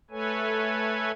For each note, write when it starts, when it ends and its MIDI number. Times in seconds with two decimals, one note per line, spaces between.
0.10 1.11 57
0.10 1.11 69
0.10 1.11 71
0.10 1.11 73
0.10 1.11 80